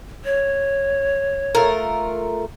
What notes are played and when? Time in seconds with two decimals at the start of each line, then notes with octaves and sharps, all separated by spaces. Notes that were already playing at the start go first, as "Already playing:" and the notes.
0.25 C#5
1.55 A3 F4 A#4